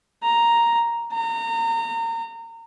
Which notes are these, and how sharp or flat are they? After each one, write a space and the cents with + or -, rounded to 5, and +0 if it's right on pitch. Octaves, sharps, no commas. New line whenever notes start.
A#5 +0
A#5 -30